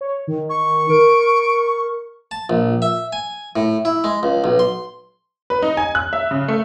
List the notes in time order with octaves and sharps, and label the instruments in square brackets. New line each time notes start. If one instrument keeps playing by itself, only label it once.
[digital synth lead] C#5
D#3
[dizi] C#6
[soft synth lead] A#4 [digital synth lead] D7
[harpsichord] A5
A#1
E5
G#5
A2
E4
G#3
C#2
B1
C6
[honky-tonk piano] B4
D#4
G#5
F#6
E5
C#3
A3